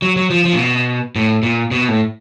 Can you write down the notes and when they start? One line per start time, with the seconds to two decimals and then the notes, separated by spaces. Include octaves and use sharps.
0.02 F#3
0.16 F#3
0.30 F3
0.45 F3
0.54 A#2
0.59 B2
1.16 A2
1.43 A#2
1.71 B2
1.89 A2